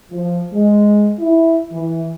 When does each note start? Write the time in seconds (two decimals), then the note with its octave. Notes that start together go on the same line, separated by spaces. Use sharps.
0.12 F3
0.53 G#3
1.20 E4
1.72 E3